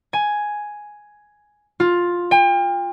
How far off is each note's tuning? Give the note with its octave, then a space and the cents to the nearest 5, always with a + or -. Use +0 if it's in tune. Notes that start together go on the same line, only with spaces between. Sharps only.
G#5 +5
F4 +10
G5 +40